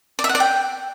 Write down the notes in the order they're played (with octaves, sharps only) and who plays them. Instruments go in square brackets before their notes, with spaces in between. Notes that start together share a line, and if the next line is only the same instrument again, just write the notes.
[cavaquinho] D5
E5
F#5
D5
G5